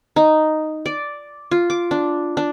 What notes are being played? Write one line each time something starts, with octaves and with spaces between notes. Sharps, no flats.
D#4
D5
F4
D6
D4
D4